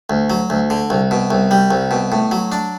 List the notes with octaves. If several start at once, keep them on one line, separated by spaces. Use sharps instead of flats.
D2
F#3
D2
D3
C2
B2
C2
G3
C2
B2
A2
F#3
D4